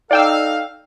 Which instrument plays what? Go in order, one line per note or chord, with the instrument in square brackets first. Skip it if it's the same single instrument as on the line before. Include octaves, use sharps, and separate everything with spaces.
[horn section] D#4 A4 F5 [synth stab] D5 G5 E6